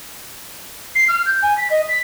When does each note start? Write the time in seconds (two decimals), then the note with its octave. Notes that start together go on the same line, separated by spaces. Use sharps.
0.95 C7
1.08 F6
1.26 G6
1.42 G#5
1.58 B6
1.70 D#5
1.88 B6